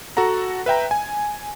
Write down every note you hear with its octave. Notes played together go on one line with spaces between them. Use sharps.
F#4 A4 F#5 A#5
B4 E5 G5 A#5
G#5